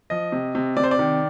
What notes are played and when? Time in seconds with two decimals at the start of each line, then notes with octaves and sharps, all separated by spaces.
0.10 F3 D#5
0.32 C3
0.55 C3
0.77 C3 D5
0.84 C5
0.91 D5
0.99 D#3